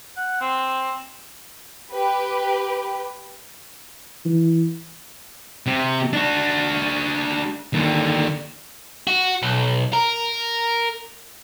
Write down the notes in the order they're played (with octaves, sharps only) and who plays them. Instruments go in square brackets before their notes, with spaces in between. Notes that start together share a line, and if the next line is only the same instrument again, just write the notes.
[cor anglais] F#5
C4
[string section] G4 B4
[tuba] E3
[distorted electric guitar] C3
D4 F#4
D#2 D3
[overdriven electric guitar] F#4
B1
A#4